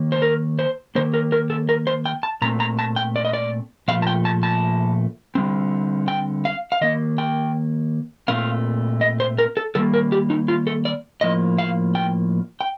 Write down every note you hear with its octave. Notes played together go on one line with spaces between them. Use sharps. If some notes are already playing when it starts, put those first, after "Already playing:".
Already playing: D#3 A#3
C5
A#4
C5
D#3 A#3 C5
A#4
A#4
A4
A#4
C5
G5
A5
A#2 A3 C4 A#5
A#5
A5
G5
D5
D#5
D5
A#2 F3 A3 F5
A5
G5
A5
A5
D3 G3 C4
G5
F5
F5
D#3 A#3 D#5
G5
A#2 A3 C4 F5
D#5
C5
A#4
A4
D#3 G3 A#3 A4
A#4
G4
D#4
F4
A4
D5
A2 F3 A#3 D#5
F5
G5
G5